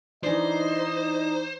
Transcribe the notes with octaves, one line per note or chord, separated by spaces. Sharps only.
E3 D4 D#4 C5 D#5